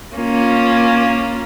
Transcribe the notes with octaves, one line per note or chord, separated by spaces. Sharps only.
A#3 C#4 F4